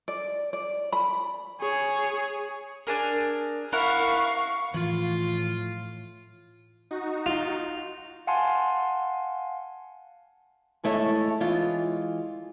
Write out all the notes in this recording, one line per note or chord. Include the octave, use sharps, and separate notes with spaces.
D5
D5
B5
G#4 C#5
D4 G#4 A#4
E4 A#4 F5 F#5 C#6
A2 E3 F3 F4
D#4 F#4
F4
F5 F#5 G#5 A5 C6
E3 G#3 A3 E4 A4 C#5
E3 G#3 F4